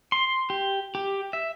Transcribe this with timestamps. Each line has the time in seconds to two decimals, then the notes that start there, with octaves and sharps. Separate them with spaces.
0.12 C6
0.50 G4
0.95 G4
1.33 E5